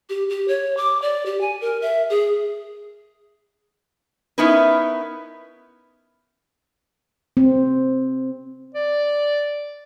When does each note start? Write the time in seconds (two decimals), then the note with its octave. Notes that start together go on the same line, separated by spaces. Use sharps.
0.09 G4
0.30 G4
0.48 C#5
0.77 D6
1.02 D5
1.26 G4
1.41 G#5
1.61 A#4
1.82 E5
2.10 G#4
4.38 B3 C#4 D#4 E4 A#4 B4
7.37 C4
8.75 D5